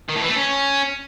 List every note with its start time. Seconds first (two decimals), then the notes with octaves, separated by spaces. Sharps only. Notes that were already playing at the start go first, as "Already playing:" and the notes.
0.09 D#3
0.16 A2
0.22 E3
0.29 A3
0.36 C#4